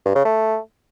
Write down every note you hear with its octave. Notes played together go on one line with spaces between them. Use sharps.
G2
C#3
A3